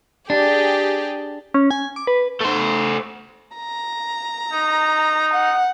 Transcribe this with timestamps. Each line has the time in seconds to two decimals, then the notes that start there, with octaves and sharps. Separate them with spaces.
0.30 D4 G4 G#4
1.54 C#4
1.71 G#5
1.96 D6
2.07 B4
2.41 A3 C5
3.56 A#5
4.53 D#4
5.33 F#5